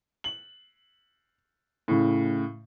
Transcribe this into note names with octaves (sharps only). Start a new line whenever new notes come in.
F#7
A2 C#3